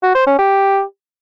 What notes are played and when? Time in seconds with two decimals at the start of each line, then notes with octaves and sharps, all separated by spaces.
0.03 F#4
0.15 C5
0.27 C#4
0.39 G4